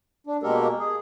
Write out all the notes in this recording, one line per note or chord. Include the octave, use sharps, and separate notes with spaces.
D4
B2 G#3 A#3 G4 A4 A#4
G#4